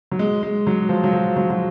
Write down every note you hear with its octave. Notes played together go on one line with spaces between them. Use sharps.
F#3
G#3
G#3
F#3
F3
F#3
F3
F#3
F#3